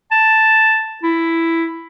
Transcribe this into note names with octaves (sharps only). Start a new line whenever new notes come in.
A5
E4